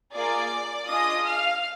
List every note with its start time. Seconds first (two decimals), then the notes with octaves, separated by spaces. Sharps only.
0.14 A#3 F4 G#4 D5 D6
0.88 D4 F4 G#4 D#5 D#6
1.25 F5 F6